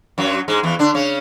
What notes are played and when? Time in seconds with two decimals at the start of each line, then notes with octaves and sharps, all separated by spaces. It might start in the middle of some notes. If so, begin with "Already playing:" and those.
0.18 F#2 F#3
0.48 G#2 G#3
0.63 E2 E3
0.79 D3 D4
0.94 C#3 C#4